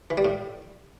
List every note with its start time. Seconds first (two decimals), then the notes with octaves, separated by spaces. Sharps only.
0.10 E3
0.18 G3
0.25 A2